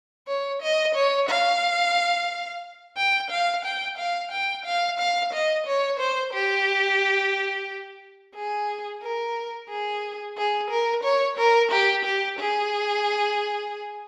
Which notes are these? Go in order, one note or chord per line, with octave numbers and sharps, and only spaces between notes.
C#5
D#5
C#5
F5
G5
F5
G5
F5
G5
F5
F5
D#5
C#5
C5
G4
G#4
A#4
G#4
G#4
A#4
C#5
A#4
G4
G4
G#4